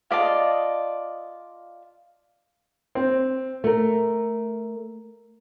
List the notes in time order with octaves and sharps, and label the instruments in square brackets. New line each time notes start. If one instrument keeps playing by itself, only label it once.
[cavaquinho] F4 D5 D#5 A5
[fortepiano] C4
[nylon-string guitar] A3 A#4